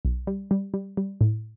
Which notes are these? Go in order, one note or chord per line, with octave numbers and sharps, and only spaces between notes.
B1
G3
G3
G3
G3
A2